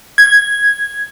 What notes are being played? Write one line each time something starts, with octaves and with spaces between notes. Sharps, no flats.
G#6